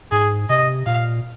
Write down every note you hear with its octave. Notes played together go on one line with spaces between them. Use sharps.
G#2 G#4
C3 D#5
A#2 F5